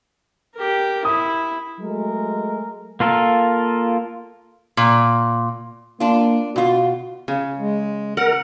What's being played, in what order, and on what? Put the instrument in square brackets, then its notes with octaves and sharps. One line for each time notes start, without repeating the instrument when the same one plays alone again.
[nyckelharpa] G4 A#4
[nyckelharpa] E4 [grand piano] D#6
[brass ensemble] F#3 G#3 A3 A#4
[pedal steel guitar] A#3 F4 A4 A#4
[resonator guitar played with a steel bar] A#2
[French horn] A#3 [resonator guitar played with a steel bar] D4 F4
[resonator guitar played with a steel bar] B2 F4 [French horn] F#4
[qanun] C#3
[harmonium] G#3
[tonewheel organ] A#4 [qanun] F#5